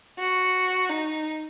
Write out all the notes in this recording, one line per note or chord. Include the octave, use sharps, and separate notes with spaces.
F#4
D#4